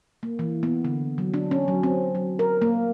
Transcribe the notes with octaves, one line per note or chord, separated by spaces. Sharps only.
A#3
E3
B3
D3
F#3
D4
C#4
F#3
C4
F#3
A#4
A#3